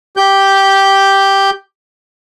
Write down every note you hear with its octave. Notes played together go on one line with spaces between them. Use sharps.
G4 G6